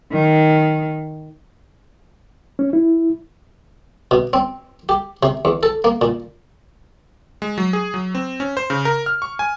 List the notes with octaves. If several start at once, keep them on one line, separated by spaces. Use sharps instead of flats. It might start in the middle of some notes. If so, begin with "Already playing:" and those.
D#3
C#4
E4
B2
C4
G4
C3
E2
A4
A#3
A#2
G#3
F#3
G#4
F#3
C4
C#4
C5
C#3
A#4
F6
C#6
G#5